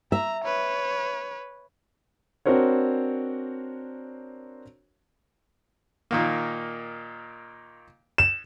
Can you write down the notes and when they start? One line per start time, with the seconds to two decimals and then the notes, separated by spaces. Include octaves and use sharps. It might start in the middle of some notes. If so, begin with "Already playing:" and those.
0.12 E5 A#5
0.44 B4 C#5
2.46 C4 D4 F#4 A#4 C5 C#5
6.11 A#2 D#3 A#3
8.18 E7